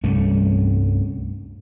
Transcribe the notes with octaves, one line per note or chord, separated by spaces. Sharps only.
C2 G2 A3 C#4